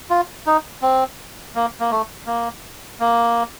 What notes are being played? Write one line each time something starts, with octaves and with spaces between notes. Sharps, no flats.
F4
D#4
C4
A#3
A#3
A3
A#3
A#3